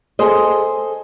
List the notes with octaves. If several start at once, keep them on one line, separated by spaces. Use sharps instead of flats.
G#4 A4 C5 D#5